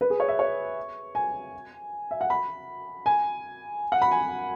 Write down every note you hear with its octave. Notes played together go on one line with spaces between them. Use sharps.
B4
G#4
C#5
E5
C#5
G#5
E5
F#5
B5
G#5
F#5
B5
G#5